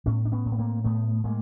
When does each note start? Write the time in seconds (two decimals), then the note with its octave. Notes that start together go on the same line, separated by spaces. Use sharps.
0.06 A2 B3 C#4
0.25 D4
0.32 B3 C#4
0.45 A2
0.52 B3
0.58 A#3 C4
0.84 A2 A3 B3
1.24 A2 G#3 A#3